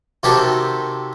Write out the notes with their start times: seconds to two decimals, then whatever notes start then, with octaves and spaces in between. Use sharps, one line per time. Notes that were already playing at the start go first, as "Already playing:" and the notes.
0.23 C3 D#3 C4 F#4 G4 A4